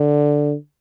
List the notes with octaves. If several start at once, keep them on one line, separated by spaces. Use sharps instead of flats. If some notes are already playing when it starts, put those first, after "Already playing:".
Already playing: D3